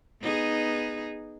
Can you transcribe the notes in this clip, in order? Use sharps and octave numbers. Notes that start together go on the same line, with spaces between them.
B3 D#4 G#4